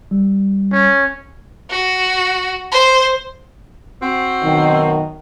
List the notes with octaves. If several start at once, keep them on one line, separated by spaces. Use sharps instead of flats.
G3
C#4
F#4
C5
C4 F#4
F#2 B2 D#3